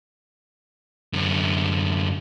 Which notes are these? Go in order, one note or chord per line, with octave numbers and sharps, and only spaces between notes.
F#2 D3